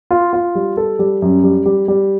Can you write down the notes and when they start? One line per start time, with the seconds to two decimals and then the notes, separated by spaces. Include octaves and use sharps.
0.11 F4
0.33 F4
0.55 G3
0.77 A4
0.99 G3
1.22 F#2
1.44 G3
1.66 G3
1.88 G3